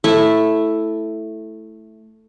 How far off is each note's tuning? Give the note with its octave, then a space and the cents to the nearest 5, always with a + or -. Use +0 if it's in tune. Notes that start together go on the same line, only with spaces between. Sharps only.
A3 +0 E4 +0